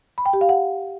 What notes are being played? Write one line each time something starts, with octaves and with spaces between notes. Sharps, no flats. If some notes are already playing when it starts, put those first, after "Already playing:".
B5
G5
G4
F5
F#5